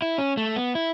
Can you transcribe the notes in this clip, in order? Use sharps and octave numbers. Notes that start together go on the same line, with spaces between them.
E4
C#4
A3
B3
E4